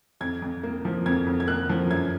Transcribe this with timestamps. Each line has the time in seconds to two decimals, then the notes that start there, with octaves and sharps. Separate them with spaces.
0.21 F2 G#6
0.42 F2
0.63 A#3
0.85 F3
1.06 F2 G#6
1.26 F2
1.40 G#6
1.48 A#3 F#6
1.69 F3
1.90 F#2 G#6